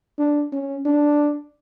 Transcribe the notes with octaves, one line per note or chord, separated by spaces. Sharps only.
D4
C#4
D4